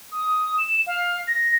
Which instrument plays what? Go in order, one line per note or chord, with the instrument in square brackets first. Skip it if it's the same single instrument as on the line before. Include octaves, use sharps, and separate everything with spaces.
[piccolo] D#6
E7
F5
A#6